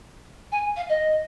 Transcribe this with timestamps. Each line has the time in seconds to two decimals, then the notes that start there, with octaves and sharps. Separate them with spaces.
0.52 G#5
0.76 F5
0.89 D#5